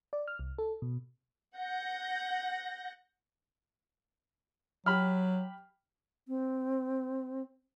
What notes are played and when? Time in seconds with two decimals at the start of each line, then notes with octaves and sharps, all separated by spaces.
0.13 D5
0.28 F6
0.39 C2
0.58 A4
0.82 B2
1.57 F#5 G6 A#6
4.86 F#3 G4 B5 F6
6.28 C4